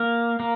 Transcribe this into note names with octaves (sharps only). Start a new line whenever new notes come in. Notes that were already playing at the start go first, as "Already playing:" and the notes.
Already playing: A#3
A#3